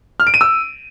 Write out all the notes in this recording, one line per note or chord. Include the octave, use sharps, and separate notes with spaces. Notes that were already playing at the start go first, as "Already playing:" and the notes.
F6
D7
D#7
E6